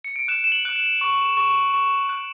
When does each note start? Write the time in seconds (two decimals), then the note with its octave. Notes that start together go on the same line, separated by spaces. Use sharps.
0.04 C#7
0.16 D7
0.28 F#6 E7
0.44 E7
0.52 F#7
0.65 F#6
0.76 F#7
1.01 C#6
1.37 C#6
1.74 C#6
2.09 F#6